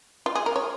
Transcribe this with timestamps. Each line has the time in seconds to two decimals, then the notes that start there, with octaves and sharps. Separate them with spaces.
0.26 F4
0.35 G#4
0.46 A#4
0.56 C#5